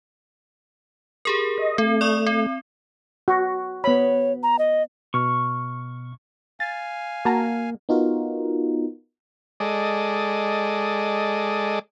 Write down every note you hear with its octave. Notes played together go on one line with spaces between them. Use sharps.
G4 G#4 A#4
D#5
A3 C4
D5 C#6 D#6
C4
F#4
B3 C#5 B5
A#5
D#5
B2 C#6 F6
F5 G#5 A6
A#3 F#4 A5 A#5
B3 D#4 F4 F#4 A#4
G#3 A4 D5 D#5